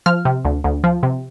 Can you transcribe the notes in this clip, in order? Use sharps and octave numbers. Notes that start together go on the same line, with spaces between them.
F3 F6
C3
D2
D2
F3
C3